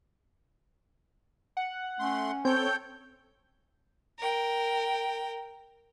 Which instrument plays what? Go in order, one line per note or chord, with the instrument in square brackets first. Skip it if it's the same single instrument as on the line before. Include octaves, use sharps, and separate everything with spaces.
[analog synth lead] F#5
[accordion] A3 C6 [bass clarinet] C#4
[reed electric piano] C4 [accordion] A4 C#5 G5 [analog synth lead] G6
[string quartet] A#4 G5